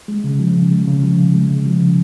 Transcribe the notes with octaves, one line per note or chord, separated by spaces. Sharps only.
G#3
C#3
F3
C#3
G#3
C#3
F3
C#3
G#3
C#3
F3
C#3